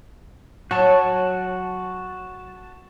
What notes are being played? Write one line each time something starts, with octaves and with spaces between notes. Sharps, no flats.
F#3 F#4 A5